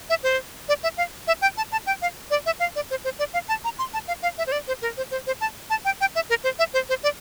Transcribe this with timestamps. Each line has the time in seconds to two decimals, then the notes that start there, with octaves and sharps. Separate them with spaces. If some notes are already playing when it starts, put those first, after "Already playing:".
0.10 E5
0.23 C5
0.69 D5
0.83 E5
0.97 F5
1.27 E5
1.42 G5
1.57 A5
1.72 A5
1.87 G5
2.02 F5
2.30 D5
2.46 E5
2.60 F5
2.76 D5
2.90 C5
3.04 C5
3.19 D5
3.34 F5
3.48 A5
3.64 A#5
3.79 C6
3.93 A5
4.08 F5
4.22 F5
4.38 E5
4.47 C5
4.52 D5
4.68 C5
4.82 A#4
4.97 C5
5.11 C5
5.27 C5
5.41 A5
5.70 A5
5.85 G5
6.01 G5
6.15 E5
6.30 A#4
6.44 C5
6.59 E5
6.74 C5
6.89 C5
7.03 D5